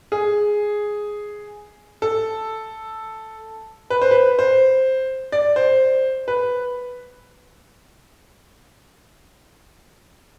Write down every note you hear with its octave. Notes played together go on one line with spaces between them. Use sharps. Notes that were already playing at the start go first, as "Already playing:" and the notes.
G#4
A4
B4
C5
B4
C5
D5
C5
B4